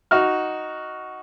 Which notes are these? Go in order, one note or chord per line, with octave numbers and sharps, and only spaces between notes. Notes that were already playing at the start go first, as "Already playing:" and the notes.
D#4 F#4 F6